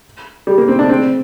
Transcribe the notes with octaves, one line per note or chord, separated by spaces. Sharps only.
G3
A#3
C4
D4
C4